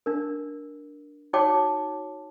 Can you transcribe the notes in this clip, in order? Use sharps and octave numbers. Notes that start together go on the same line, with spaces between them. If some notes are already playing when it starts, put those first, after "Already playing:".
D4 A#4
D#4 F#4 C#5 G5 A5 D6